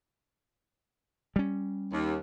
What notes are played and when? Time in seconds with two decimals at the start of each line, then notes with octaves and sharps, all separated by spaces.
1.36 G3 C#4
1.92 D#2